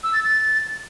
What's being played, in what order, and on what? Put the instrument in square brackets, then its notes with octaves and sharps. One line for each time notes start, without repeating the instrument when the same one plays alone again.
[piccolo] E6
A6
A6